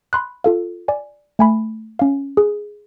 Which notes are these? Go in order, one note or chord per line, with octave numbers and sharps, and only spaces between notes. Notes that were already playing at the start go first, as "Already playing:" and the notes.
B5 C6 F#6
F4 A4 F5
D5 G#5
A3 G#5 B5
C#4 F5
G#4